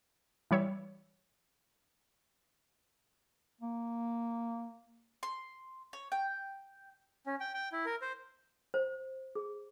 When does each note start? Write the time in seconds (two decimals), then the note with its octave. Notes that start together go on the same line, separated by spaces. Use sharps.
0.51 E3 G3 C#5 E5
3.61 A#3
5.23 C6
5.93 C#5
6.12 G5
7.27 C#4
7.40 G5
7.54 G5
7.72 E4
7.86 A#4
8.02 C5
8.74 C5
9.35 G#4